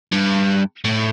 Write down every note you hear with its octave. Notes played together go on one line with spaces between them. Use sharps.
G2
A2